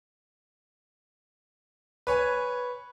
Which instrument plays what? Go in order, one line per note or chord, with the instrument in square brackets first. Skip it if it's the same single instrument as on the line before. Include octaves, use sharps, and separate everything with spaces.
[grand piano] B4 C#5 G#5